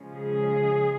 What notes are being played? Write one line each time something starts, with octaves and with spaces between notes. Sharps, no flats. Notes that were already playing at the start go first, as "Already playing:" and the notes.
Already playing: C#3 F3 G#3 C#4
G#4